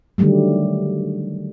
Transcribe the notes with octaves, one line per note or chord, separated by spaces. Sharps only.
D3 D#3 F#3 G3 A3